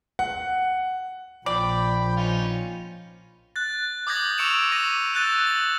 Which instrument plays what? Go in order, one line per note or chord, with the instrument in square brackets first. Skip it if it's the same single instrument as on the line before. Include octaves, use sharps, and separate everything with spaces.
[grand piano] F#5
[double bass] A#1 [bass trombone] F3 [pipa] D5 [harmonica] G5 B5
[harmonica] C#4 D#4 F4
[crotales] F#6 A6
D6 D#6 G6 G#6 A#6 F#7
C#6 E6 C#7 D7 E7 F7
C#6 D6 A#6 D#7
E6 F#6 A6 D#7
A6 F#7